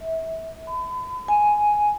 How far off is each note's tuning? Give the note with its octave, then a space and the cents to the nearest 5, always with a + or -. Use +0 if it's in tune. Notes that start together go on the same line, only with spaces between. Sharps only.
E5 -25
B5 +40
G#5 +5